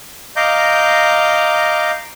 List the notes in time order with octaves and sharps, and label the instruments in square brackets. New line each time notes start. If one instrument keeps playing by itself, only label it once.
[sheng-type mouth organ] D#5 F5 A#5 D6 G6